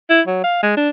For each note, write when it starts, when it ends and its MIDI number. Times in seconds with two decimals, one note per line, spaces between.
0.10 0.21 64
0.27 0.42 54
0.44 0.59 77
0.63 0.75 56
0.77 0.89 62